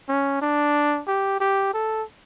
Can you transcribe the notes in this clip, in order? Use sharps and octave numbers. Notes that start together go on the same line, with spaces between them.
C#4
D4
G4
G4
A4